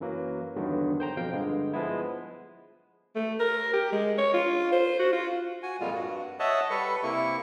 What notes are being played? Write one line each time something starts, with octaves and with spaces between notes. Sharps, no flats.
F#2 E3 F#3 A#3
E2 G2 D3 D#3 F#3
C5 G5 A#5
F2 B2 F3 F5 G5
G2 D3 G#3
F3 G#3 B3 E4
A3
A#4
G4
G#3
C#5
F4
C5
F#4
F4
F#4 G#5
F2 A#2 G3 G#3 F4
G2 F#4
C#5 D#5 E5 F#5 A5
G3 A4 B4 C#6
C3 A#3 E4 C#6